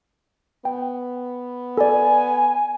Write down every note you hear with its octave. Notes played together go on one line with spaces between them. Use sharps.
B3 G5
A4 D5 G#5